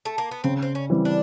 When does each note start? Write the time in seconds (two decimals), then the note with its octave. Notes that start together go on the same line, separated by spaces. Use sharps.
0.05 A3
0.18 A#3
0.31 B3
0.44 C#3 C4
0.62 C4
0.75 C#4
0.90 E3 G3 C4
1.05 D4